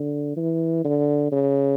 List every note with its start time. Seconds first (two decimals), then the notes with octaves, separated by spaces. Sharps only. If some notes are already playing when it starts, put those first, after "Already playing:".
Already playing: D3
0.37 E3
0.85 D3
1.32 C#3